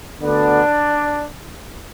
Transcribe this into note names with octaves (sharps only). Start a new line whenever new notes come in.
D2 D3 B3 D4